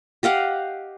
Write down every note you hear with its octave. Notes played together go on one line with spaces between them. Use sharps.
G4 D#5 F5 F#5